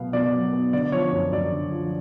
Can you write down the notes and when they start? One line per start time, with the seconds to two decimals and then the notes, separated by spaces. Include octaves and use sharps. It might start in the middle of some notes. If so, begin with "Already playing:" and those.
Already playing: B2 F#3 B3 F5
0.13 B2 D5
0.33 F#3
0.53 B3
0.73 D3 D5
0.92 F3 C#5
1.12 F#2 C#5
1.32 F#2 D5
1.52 D3
1.72 F3